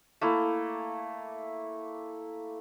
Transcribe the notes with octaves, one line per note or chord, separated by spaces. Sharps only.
A3 A#3 E4